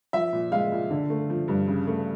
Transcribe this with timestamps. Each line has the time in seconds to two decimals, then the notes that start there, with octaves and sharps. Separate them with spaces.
0.13 F3 E5
0.33 A#2
0.52 G#3 F5
0.72 A#2
0.90 D3
1.10 A3
1.30 F3
1.48 G2
1.68 C#3
1.87 A3